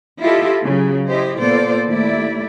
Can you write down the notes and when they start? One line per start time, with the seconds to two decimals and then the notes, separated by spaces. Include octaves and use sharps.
0.21 E4 F4 G4 A4 D#5 E5
0.62 C#3 F#3
1.08 E4 G4 C5 D#5
1.39 A#2 B3 F4 A4 C5 D5
1.88 D#2 A3 E4 D5